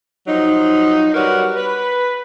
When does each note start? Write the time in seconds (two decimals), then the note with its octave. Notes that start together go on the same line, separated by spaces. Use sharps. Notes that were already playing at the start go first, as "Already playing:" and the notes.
0.27 F3 F#3 D#4
1.14 G3 F#4 A#4 B4 C#5
1.56 B4